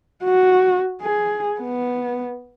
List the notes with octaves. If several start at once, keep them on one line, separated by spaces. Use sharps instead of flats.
F#4
G#4
B3